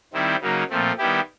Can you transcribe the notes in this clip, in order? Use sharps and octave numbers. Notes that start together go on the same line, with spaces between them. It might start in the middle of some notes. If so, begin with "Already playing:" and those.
D#3 G3 C4 E4
C#3 F#3 A#3 D#4
A#2 F3 A3 C4
D#3 G3 B3 E4 G4